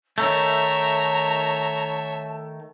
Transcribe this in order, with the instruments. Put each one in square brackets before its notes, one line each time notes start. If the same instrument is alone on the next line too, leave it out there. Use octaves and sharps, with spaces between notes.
[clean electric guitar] D#3 A3 [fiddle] C#5 E5 [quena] A5 [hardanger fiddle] A#5